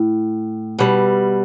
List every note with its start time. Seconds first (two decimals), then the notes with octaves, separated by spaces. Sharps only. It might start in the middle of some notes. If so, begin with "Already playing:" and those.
Already playing: A2
0.79 B2 G3